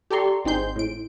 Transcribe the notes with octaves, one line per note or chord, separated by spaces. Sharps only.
G4 A4 D5 A#5 C6 C#6
G#1 C4 D#4 G#4 C6 G6
A2 D7